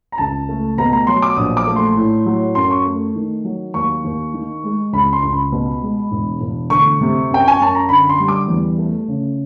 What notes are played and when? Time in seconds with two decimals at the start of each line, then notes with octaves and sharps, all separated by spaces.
0.12 A#5
0.18 C#2 A5
0.49 A3
0.78 B2 A#5
0.93 A#5
1.07 F#3 C6
1.22 D6
1.37 A#1 D#6
1.57 D6
1.67 A3
1.76 C6
1.96 A2
2.26 F#3
2.55 F#2 C6
2.71 C#6
2.85 A3
3.16 D#3
3.45 F#3
3.74 D#2 C#6
4.04 D#2
4.34 D#3
4.64 G#3
4.93 C#2 B5
5.13 C6
5.23 C#2
5.33 B5
5.52 B2
5.82 G#3
6.11 E1
6.41 E1
6.70 D2 C#6
7.01 C3
7.30 F#2 G5
7.48 G#5
7.60 F#2 A5
7.75 A#5
7.89 D3 B5
8.09 C6
8.20 G3
8.28 D6
8.48 E2
8.78 A3
9.08 C#3